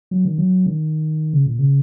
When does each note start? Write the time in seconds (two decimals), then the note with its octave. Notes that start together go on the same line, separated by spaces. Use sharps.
0.11 F#3
0.25 D#3
0.38 F#3
0.66 D#3
1.33 C#3
1.47 A#2
1.59 C#3